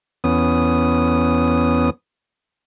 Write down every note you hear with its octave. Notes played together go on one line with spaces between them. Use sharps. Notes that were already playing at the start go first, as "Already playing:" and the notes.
E2 B3 C#4 D#6